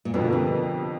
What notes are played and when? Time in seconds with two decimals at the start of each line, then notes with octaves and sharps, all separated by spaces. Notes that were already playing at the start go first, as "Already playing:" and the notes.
0.05 A#2
0.14 F2 B2 D3 F3 A#3
0.33 C3